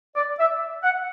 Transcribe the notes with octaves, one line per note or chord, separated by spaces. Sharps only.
D5
E5
F#5